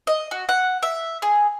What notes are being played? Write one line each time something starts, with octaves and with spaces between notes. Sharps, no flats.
D#5
F#4
F#5
E5
G#4